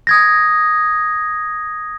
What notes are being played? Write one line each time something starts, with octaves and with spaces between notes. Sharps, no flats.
D#6 G#6 A#6